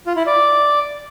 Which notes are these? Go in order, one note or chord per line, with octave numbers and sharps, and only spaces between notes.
F4
E4
D5